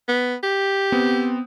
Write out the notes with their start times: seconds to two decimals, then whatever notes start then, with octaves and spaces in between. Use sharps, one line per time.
0.08 B3
0.43 G4
0.92 B3 C4